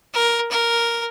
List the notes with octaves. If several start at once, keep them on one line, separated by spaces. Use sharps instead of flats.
A#4
A#4